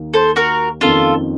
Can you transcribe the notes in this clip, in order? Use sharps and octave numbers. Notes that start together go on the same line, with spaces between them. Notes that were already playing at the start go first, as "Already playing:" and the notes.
Already playing: D#2 D#3 A#3
A4 C5
F#4 A#4
F2 D#3 A#3 C#4 F4 A4